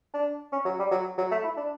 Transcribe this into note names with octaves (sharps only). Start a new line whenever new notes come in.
D4
C#4
F#3
G3
F#3
F#3
A3
E4
D4